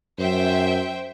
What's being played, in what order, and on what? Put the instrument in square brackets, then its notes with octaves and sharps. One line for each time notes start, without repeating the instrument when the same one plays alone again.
[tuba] F#2 [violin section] C5 E5 G5